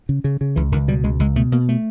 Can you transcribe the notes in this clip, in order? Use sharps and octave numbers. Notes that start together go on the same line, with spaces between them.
C#3
C#3
C#3
C#2 E3
C#2 D#3
B2 G3
C#2 G#3
C#2 G#3
B2 A3
B2 A#3
A3